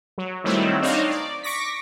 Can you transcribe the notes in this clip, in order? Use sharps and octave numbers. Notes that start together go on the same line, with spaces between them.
F#3
D#3 F#3 G3 A3 C4 E4
C4 D4 D#4 C#5 D#5 F5
D5
C#6 D6 A#6 B6